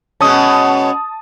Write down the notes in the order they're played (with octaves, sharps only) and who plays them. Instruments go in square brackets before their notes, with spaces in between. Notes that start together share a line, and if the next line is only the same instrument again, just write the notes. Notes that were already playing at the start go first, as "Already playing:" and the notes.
[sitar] B2 G#3 C#4 [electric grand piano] A5 D#6